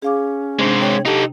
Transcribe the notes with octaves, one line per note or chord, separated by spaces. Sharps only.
C#4 G#4 F5 D6
C3 G#3 C4 D4
C#5 G5
D#4 G4 A4